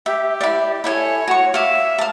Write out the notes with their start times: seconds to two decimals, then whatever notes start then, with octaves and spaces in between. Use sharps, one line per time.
0.06 G4 E5
0.41 E4 D5
0.84 E4 A4 C#5 G#5
1.28 F#4 C#6
1.54 E5 F5 D6
1.98 F5 A5